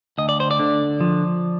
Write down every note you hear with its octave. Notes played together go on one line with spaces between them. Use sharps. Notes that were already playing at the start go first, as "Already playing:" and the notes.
D2 D#5
D5
C5
D5
D3
F3